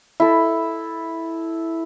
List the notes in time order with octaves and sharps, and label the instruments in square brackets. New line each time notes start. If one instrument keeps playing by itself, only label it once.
[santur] E4 A4